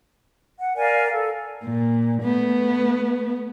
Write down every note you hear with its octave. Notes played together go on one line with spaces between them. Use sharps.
F#5
A#4 D5 F5 G#5
A4
A#2
A3 B3